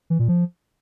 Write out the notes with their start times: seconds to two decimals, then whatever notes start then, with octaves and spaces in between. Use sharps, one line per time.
0.10 E3
0.19 A#2
0.28 F3